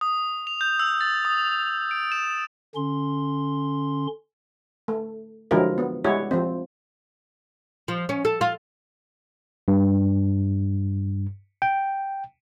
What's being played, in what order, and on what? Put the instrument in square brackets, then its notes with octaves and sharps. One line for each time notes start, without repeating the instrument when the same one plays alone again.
[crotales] D#6
F7
G6
E6
A6
D#6
D7
E7
[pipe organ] D3 C#4 C6
[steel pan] A3
D3 F3 F#3 G#3 E4 A#4
B3
G3 G#3 E4 F#4 C#5
F3 C4
[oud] F3
C#4
A4
F4
[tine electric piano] G2
G5